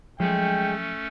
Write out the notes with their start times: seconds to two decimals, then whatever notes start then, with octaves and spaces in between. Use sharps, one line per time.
0.20 F3 F#3 G#3 A3 C#4 G#4 A4 G5